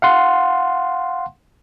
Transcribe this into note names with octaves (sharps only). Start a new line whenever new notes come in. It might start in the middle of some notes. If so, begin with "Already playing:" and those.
F5 F#5 C6